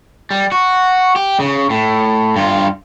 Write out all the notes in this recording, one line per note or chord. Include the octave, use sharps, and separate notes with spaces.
G3
F#4
G4
C#3
A2
G2 F4